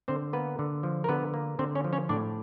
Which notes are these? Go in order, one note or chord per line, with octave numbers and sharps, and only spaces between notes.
D3 C4 C5
A#3 B3 B4
D3
F3
A#4
D3 B3 B4
A#3
D3 C4 C5
C#4 C#5
F3
C#4 C#5
A2 D4 D5